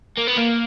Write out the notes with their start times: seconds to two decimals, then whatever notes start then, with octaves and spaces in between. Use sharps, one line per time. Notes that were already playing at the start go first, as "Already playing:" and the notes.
0.18 A#3
0.28 B3
0.38 A#3